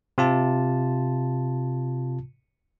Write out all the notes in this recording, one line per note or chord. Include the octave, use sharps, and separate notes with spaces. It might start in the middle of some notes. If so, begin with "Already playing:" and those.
C3 F4 A5